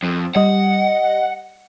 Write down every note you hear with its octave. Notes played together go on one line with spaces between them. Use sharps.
F2
G3 D#5 F#5